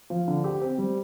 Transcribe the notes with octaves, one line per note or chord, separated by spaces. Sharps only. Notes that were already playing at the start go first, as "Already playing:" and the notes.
F3
D3
G4
C4
G3